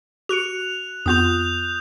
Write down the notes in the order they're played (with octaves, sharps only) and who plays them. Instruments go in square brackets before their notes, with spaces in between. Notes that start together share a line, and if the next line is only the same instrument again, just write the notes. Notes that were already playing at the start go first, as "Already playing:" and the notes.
[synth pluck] F#4 C#7 [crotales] F#6 F7
[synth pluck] F2 B3 F4 [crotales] D#6 G6 F7